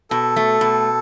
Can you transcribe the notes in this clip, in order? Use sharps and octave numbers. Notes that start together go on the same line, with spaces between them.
B2 A4
A3
B2